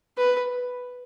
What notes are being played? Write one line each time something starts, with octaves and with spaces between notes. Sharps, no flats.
B4